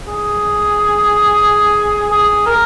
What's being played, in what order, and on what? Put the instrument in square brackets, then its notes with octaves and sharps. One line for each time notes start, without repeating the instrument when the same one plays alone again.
[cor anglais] G#4
G#4
A#4